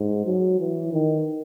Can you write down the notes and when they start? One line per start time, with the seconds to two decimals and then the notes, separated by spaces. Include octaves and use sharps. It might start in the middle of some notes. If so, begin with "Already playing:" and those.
Already playing: G#2
0.26 F#3
0.60 E3
0.93 D#3